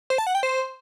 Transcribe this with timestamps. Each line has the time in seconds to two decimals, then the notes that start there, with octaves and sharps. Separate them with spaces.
0.10 C5
0.18 A5
0.27 F#5
0.35 G5
0.43 C5